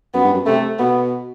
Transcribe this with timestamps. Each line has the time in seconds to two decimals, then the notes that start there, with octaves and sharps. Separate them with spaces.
0.14 F#2 B3
0.24 G2
0.34 F#2
0.46 C3 A3
0.79 B2 B3